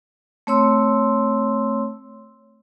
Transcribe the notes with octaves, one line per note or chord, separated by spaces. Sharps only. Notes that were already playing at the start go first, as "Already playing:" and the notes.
A3 C4 C#5 C6 E6